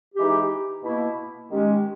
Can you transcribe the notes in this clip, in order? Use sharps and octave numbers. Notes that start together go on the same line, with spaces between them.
E3 G#3 D#4 G4
B2 A#3 E4
D#3 G#3 C#4 G4